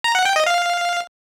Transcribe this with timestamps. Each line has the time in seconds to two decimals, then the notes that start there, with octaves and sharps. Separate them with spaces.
0.04 A#5
0.15 F#5
0.25 G5
0.36 D#5
0.46 F5